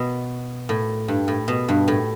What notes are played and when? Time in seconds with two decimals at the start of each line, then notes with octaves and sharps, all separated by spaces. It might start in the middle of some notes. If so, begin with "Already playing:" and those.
Already playing: B2
0.69 A2
1.08 G2
1.28 A2
1.48 B2
1.68 G2
1.88 A2